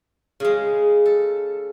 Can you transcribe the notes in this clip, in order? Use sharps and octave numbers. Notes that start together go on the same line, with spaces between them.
C#3 G#3
A4